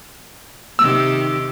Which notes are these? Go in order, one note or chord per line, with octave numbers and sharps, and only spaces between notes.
C3 D#3 G4 E6